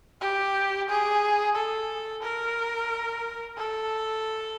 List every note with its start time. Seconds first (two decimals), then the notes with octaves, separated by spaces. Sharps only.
0.21 G4
0.89 G#4
1.55 A4
2.23 A#4
3.57 A4